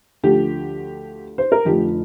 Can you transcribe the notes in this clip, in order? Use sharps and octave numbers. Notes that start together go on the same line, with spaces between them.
D2 D3 F3 G4
C5
A#4
F1 F2 D3 F3 G4